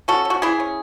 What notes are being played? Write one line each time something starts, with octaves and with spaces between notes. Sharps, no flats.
C#4 F#4 A4
C#4
F#4
E3 E4 G#4
C#4